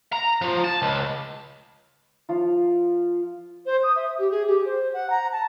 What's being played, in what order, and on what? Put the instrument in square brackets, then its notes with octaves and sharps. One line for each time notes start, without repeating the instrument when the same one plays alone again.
[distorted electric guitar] A#5
F3
A5
C#2
[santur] F3 F4
[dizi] C5
D#6
E5
G4
G#4
G4
C5
F#5
A#5
A5